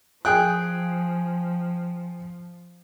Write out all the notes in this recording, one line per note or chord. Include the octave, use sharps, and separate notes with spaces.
F3 G#4 G5 F#6